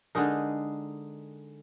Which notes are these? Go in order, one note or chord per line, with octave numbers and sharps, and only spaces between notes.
D3 G#3 D#4 A#4